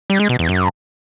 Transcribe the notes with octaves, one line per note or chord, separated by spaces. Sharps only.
G3
G#3
B2
E2
F#2